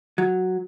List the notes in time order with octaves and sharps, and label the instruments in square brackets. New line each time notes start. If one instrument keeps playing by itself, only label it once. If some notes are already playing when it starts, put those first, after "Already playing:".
[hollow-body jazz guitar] F#3